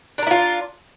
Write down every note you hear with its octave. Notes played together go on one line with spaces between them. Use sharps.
D4 E4 F4 A#4